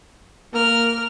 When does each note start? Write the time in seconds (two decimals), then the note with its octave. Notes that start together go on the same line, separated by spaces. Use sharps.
0.54 A#3 A#4 F6